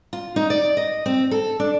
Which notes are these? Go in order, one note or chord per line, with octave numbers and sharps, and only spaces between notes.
F4
D#4
D5
D#5
C4
A4
D4